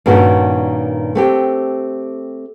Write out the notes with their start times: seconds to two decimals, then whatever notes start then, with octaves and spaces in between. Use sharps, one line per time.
0.06 G2 A#2 D#3 C#4 F#4 A#4
1.15 A3 C4 G4